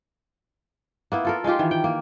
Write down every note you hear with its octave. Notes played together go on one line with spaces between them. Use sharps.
A#3 B3 E4
F4 A4 A#4
G#3 D#4 F4 G4
D#3 E3
G5
A#3